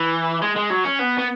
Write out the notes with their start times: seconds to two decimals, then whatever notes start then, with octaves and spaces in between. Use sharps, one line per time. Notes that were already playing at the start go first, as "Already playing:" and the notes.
Already playing: E3
0.42 G#3
0.56 G#3
0.70 F#3
0.84 C#4
0.99 B3
1.18 B3